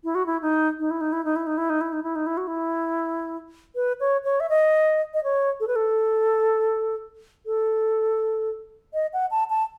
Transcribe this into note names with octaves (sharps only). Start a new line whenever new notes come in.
E4
F#4
E4
D#4
D#4
E4
D#4
E4
D#4
E4
D#4
E4
D#4
E4
D#4
E4
D#4
E4
F#4
E4
B4
C#5
C#5
E5
D#5
D#5
C#5
A4
B4
A4
A4
D#5
F#5
A5
A5